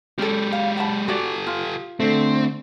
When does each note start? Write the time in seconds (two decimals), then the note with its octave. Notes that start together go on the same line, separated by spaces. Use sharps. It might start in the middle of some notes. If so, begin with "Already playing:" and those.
0.19 G#3 C#4 G4 A4
0.53 F5
0.77 F#5 A5 B5
1.08 F#4 G4 A4 D5
1.47 F4
2.00 D3 A3 C4